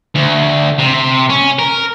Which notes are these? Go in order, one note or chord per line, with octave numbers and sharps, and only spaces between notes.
D2
C3
C#4
A#4